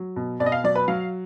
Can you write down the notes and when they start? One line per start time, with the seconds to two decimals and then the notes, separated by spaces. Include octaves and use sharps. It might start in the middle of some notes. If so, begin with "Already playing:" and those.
Already playing: F#3
0.16 B2
0.40 B2 D5
0.46 D#5
0.52 F5
0.64 F#3 D5
0.76 B4
0.88 F#3 F5